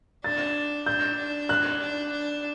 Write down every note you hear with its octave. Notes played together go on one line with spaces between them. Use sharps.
D4 A6
D4 G6
D4
F#6
D4
D4